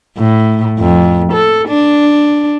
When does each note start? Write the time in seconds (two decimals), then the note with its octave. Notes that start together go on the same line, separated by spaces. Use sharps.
0.18 A2
0.79 F2
1.33 A4
1.68 D4